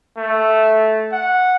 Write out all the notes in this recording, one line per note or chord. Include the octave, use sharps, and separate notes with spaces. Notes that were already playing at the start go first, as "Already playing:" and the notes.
A3
F#5